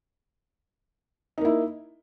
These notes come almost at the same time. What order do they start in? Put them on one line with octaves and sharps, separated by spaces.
D#4 A#3 E4